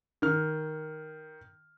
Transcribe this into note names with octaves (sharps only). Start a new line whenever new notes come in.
D#3 F6